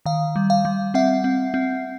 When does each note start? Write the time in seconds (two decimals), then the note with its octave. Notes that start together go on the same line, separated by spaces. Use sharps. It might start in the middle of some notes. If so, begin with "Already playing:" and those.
0.06 D#3 F5
0.36 G3
0.50 F5
0.65 G3
0.94 C4 E5 F#5
1.24 C4
1.54 C4